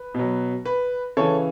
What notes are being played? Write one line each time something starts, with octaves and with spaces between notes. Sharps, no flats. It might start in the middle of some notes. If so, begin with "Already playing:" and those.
Already playing: B4
B2 F#3
B4
C#3 E3 A4 C#5